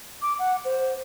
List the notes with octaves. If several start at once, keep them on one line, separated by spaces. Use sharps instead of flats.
D6
F#5
C5